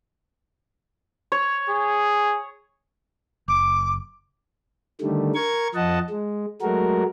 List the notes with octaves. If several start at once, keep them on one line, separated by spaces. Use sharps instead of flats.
C#5
G#4
F#1 D6
D3 D#3 G3 A3
A#4 C#6 G#6
F2 F3 D#5 F#5 A5
G#3
F#3 G#3 A3 F#4 A#4